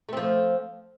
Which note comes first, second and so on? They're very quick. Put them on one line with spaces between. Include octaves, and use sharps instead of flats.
A3 C4 F3